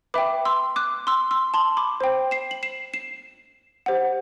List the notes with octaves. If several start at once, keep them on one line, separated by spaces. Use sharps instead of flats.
B4 E5 G5 B5 D6
C6 E6
D6 F#6
C6 E6
C6 E6
A5 C6
B5 D6
C5 G5
C7 E7
F#7
C7 E7
C7 E7
G4 C5 F#5